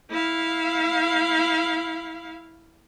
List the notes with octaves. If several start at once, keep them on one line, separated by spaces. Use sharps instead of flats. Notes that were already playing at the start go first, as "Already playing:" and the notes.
E4 F5